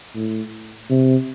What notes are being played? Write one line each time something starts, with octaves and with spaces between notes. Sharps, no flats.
A2
C3